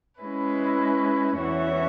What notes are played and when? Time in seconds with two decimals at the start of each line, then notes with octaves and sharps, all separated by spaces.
0.21 G#3 C#4 E4 B4
1.38 E2 E3 C#4 F#4 E5